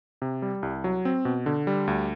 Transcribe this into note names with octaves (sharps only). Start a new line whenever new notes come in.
C3
G3
C2
F#3
C4
B2
D3
G3
D2